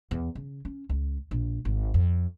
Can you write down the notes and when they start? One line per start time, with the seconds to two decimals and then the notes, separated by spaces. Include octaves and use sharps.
0.11 E2
0.35 C#3
0.65 C#4
0.89 C#2
1.31 A#1
1.65 G#1
1.94 F2